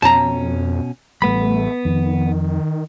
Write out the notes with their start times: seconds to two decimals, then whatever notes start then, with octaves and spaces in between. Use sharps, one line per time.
0.02 F2 B2 C#4 A5 A#5
1.22 A1 G3 A3 B3 B5
1.85 F2 D#3